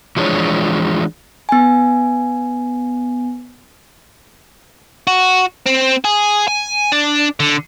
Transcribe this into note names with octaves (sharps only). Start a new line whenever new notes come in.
E3 F3 G#3 D4 C#5
B3 G#5
F#4
C4
G#4
G#5
D4
D3